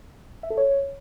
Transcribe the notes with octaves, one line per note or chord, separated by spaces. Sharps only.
E5
A4
C#5